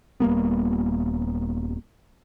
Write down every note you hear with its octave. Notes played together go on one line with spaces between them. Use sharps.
D#1 G3 A#3 B3